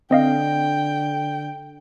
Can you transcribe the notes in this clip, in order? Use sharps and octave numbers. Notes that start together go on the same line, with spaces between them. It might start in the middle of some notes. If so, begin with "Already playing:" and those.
D3 C4 D#5 F5 G5